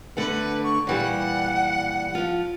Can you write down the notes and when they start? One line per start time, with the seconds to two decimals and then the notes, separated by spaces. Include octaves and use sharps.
0.17 D3 A3 B4 F#5
0.63 C#6
0.87 A#2 E3 G3 F#5
2.15 F3 F4